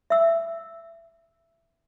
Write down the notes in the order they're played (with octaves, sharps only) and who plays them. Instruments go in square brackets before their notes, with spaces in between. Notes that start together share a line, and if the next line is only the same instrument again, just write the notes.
[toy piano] E5 E6